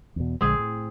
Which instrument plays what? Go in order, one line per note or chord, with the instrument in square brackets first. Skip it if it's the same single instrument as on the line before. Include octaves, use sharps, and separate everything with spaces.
[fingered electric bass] E2 B2
[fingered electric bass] A#1 D3 G#3 [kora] C4 G#4
[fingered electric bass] A2